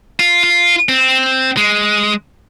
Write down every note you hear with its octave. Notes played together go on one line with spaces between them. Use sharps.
F4
F4
C4
G#3